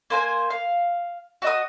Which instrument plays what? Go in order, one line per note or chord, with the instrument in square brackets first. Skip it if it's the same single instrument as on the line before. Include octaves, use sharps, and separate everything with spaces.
[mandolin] A#3 C5 G#5
F5
F#4 D#5 D#6